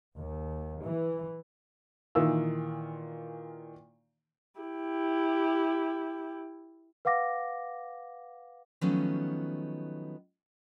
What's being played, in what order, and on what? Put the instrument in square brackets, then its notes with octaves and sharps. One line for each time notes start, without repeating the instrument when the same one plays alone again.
[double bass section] D#2
E3
[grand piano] A#2 D#3 E3 F4 E6
[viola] E4 G4
[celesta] B4 F5 F#5 D6 A#6
[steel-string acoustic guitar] D#3 F3 F#3 A3 B3 C#4